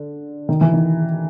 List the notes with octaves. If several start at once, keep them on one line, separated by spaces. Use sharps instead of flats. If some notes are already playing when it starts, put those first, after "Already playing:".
Already playing: D3
D#3
E3
D#3